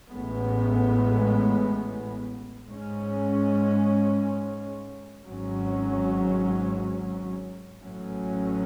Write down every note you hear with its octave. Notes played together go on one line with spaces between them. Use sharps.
A1 A2 G#3 B3
G#2 G#3 C#4
G#1 G#2 F#3 C#4
A1 A2 F#3 C#4